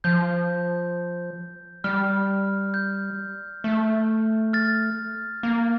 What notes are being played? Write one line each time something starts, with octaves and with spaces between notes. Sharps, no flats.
F3 G6
G3 F6
G6
A3
F6 A6
A#3